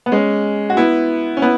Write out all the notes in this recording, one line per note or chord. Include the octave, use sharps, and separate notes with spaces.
B3
G#3 C#4
F#4
B3 E4
C#4
B3 E4